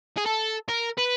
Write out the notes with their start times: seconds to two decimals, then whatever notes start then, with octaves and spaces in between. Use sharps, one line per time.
0.17 G#4
0.26 A4
0.69 A#4
0.98 B4